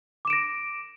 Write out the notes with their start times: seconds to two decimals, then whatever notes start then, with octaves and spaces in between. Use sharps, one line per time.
0.25 D6
0.27 E7
0.30 D7
0.33 A#6